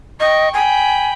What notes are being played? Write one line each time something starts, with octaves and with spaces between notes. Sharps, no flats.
D#5 G5 C#6
G5 G#5 B5